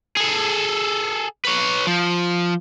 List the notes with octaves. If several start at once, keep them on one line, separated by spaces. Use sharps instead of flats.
G#4 A4
B4 C#5
F3